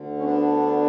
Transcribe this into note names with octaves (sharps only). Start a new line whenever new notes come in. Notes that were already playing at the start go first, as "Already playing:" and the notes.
Already playing: D2 D3
C#4
B3 D4